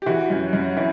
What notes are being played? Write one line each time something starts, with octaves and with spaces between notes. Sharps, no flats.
G4
E3 F#4
F#2
F#2
E3